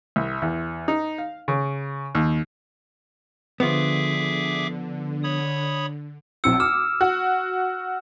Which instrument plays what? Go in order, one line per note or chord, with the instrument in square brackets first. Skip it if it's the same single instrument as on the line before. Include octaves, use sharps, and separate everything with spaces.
[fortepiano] C2
E2
D#4
F5
C#3
D#2
[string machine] D3 [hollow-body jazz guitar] F3 B3 [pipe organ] G#4 E5 D6
[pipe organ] C#5 B5 D#6
[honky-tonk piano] B1 C4 C#7 [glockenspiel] E6
[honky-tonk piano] D6 [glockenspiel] F6 E7
[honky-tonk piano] F#4